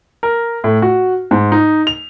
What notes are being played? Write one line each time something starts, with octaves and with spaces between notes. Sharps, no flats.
A#4
A2
F#4
G#2
D#4
F7